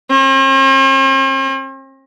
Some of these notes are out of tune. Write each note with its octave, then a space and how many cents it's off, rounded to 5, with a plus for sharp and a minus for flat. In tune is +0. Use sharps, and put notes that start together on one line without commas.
C4 +45